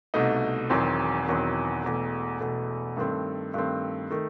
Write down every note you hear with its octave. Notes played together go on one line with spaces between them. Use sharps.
C2 B2 A3 D#4
E1 E2 D#3 F#3 C4
E1 E2 D#3 F#3 C4
E1 E2 B2 A3
E1 E2 B2 A3
G2 D#3 A3 C4
G2 D#3 A3 C4
D#3 A3